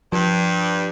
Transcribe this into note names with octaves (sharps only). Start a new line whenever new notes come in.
G2 F3